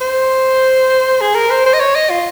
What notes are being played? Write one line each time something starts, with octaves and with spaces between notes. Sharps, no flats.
C5
G#4
A#4
C5
C5
D#5
C#5
D#5
F4